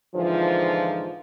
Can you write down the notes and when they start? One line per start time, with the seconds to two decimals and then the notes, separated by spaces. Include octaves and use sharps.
0.14 G#2 D3 E3 F3